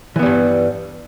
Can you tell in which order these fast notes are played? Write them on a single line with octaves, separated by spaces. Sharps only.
E3 B3 G3 G2